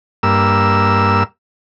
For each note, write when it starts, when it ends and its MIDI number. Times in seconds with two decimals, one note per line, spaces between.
0.23 1.23 43
0.23 1.23 58
0.23 1.23 88